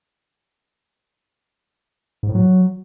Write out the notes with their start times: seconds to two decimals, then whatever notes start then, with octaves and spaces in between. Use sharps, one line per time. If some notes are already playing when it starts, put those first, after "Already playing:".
2.23 G#2
2.29 A2
2.35 F#3